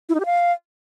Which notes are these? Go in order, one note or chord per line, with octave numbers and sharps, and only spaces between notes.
E4
D#4
G4
F5